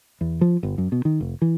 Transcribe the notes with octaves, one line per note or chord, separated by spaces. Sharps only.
E2
F3
G1
F#2
B2
D#3
F1
E3